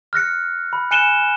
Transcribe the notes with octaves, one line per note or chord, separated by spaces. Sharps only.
F6 F#6 A#6 C#7
B5
G#5 F#6 C#7 D#7 E7 G7